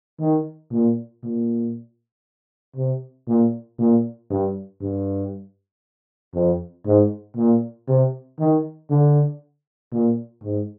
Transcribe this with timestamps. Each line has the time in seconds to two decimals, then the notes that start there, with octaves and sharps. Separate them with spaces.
0.20 D#3
0.72 A#2
1.23 A#2
2.76 C3
3.28 A#2
3.79 A#2
4.30 G2
4.81 G2
6.35 F2
6.86 G#2
7.37 A#2
7.88 C3
8.39 D#3
8.91 D3
9.92 A#2
10.43 G#2